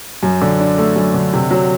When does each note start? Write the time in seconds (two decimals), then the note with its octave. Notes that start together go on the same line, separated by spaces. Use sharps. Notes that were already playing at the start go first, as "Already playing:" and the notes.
0.23 F#2
0.42 D3
0.60 D4
0.78 A3
0.96 F#2
1.14 D3
1.33 C3
1.51 F#3